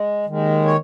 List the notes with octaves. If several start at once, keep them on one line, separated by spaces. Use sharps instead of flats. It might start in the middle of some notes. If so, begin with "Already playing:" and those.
Already playing: G#3
D#2 D#3 G#3
C#5